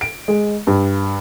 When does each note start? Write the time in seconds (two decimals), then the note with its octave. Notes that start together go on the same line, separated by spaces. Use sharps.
0.01 D7
0.28 G#3
0.67 G2